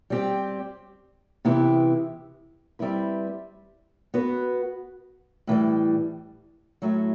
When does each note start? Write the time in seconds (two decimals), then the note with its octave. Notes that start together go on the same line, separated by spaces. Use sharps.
0.10 G3 C4 G4
1.45 C3 E3 B3 E4 G4
2.79 G3 C4 E4 B4
4.14 B3 F#4 B4
5.47 A2 E3 G3
6.82 A2 F#3 A3